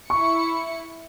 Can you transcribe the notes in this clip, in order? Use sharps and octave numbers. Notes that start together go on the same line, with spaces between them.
E4 C#6 C#7